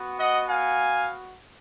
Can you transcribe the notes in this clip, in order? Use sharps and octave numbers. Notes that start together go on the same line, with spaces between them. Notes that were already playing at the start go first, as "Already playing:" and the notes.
Already playing: B3 F#4
D#5 F#5
F5 G#5